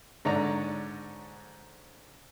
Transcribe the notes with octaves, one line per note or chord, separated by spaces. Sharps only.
G#2 D3 C#5 D5 A#5